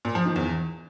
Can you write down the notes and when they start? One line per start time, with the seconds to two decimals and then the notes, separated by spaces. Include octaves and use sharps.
0.05 A#2
0.15 F3
0.25 D#3
0.36 E2